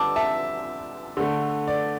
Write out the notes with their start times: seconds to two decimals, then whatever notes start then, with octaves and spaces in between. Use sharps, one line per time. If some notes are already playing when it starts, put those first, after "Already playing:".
Already playing: D3 G3 A5 D6 E6
0.16 E5 A5
1.17 D3 A3
1.68 D5